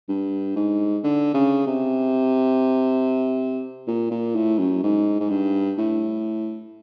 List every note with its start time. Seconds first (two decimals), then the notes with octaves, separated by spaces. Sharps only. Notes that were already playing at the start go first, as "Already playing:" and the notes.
0.09 G2
0.56 G#2
1.04 D3
1.34 C#3
1.67 C3
3.88 A#2
4.11 A#2
4.35 A2
4.58 F#2
4.83 G#2
5.20 G#2
5.30 G2
5.78 A2